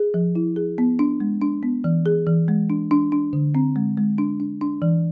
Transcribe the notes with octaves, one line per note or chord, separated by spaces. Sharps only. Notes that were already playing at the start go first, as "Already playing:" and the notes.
Already playing: G#4
F3
E4
G#4
B3
D4
G#3
D4
B3
E3
G#4
E3
G#3
D4
D4
D4
D3
C4
G#3
G#3
D4
D4
D4
E3